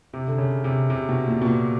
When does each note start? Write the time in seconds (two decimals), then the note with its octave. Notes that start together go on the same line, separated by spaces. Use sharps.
0.14 C3
0.28 D3
0.38 C#3
0.64 C3
0.90 C3
1.09 B2
1.27 A#2
1.42 B2
1.46 A#2